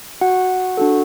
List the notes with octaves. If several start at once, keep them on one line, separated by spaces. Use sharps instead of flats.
F#4 F#5
D4 F#4 A4